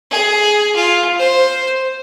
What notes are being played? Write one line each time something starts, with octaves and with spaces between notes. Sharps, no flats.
G#4
F4
C5